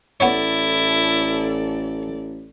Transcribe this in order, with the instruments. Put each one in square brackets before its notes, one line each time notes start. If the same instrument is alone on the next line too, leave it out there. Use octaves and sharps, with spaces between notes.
[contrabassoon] A1 [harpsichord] B3 C#5 [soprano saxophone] E4 [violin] A4 D5